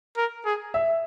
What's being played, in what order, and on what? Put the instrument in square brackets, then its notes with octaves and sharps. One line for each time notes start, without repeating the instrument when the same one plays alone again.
[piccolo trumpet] A#4
G#4
[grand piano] E5